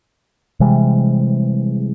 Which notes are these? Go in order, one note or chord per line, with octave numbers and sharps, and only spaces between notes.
C3 E3 G3 G#3